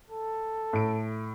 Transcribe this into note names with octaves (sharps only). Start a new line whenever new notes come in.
A4
A2 D7